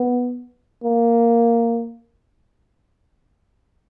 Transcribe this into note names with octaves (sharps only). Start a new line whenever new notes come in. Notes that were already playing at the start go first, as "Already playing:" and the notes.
Already playing: B3
A#3